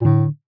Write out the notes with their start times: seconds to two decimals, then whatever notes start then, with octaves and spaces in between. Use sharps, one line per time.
0.01 A#2
0.05 A2 D3